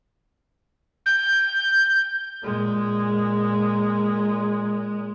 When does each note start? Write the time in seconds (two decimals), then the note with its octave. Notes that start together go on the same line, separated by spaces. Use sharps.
1.06 G6
2.43 A#2 G#3